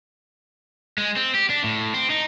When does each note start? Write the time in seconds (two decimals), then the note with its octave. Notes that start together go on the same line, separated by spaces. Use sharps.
0.98 G#3
1.16 C4
1.35 G4
1.50 D4
1.64 A2
1.94 C4
2.10 D#4